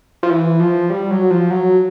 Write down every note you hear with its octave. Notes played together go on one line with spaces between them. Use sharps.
F3
E3
F3
G3
F#3
F3
F#3